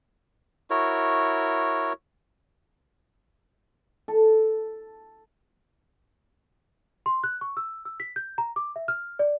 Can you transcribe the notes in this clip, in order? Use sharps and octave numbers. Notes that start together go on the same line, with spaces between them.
E4 F#4 A#4 C#5
A4
C6
F#6
C#6
E6
E6
B6
G6
A#5
D6
E5
F6
D5